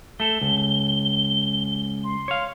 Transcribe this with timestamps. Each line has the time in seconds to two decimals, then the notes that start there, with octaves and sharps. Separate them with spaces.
0.20 A3 A4 G7
0.41 C#2
2.04 C6
2.28 C#5 F5